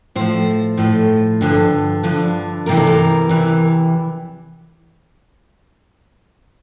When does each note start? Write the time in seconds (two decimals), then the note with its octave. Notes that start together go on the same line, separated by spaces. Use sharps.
0.15 A2 F3 C5
0.77 A2 F3
1.41 G2 D3 F3
2.03 G2 D3 F3
2.66 E2 C3 E3 A#4
2.77 A4
2.87 A#4
3.29 E2 C3 E3